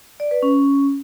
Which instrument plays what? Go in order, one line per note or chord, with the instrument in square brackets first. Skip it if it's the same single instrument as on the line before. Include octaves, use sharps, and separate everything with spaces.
[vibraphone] D5
B4
C#4